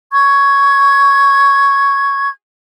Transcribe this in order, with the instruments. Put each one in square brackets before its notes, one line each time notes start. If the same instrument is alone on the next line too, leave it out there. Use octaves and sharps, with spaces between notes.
[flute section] C#6 G#6